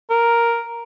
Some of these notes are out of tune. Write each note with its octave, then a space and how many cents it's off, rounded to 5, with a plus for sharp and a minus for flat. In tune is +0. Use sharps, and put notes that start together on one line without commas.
A#4 +5